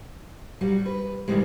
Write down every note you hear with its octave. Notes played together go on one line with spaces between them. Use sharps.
F#3 G3 F#4
B4
G#2 D#3 E3 G3 G#3